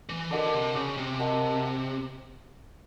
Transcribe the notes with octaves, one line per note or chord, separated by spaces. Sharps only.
E3
D3 F#4 A#4 D#5 F#5 A5
C3
C#3
C3
F#4 A#4 D#5 F#5 A5